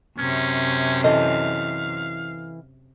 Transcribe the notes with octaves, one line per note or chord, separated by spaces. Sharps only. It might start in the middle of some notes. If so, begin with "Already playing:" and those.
F#2 C3 C#4
E3 A4 D#5 F5